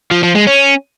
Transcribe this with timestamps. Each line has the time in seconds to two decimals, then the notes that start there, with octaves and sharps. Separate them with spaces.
0.11 F3
0.23 F3
0.35 G#3
0.47 C#4